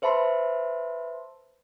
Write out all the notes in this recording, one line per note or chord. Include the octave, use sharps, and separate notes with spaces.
B4 C5 E5 A5 B5 C6